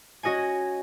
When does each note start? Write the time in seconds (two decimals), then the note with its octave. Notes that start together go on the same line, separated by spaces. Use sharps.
0.23 C#4 F#4 D#5 F#5 G#5